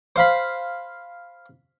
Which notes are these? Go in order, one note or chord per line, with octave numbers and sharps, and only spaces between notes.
C5 F5 B5